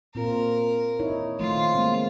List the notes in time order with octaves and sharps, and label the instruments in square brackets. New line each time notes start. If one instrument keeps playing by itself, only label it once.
[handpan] A#2 C4 F4 [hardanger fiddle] A#4
[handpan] D#4 E4 C#5
[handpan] D#3 F3 A3 [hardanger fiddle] F4
[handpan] G#3 A#3 C4